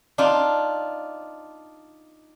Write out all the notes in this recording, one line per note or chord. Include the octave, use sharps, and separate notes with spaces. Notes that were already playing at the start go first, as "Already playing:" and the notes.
D4 D#4 F4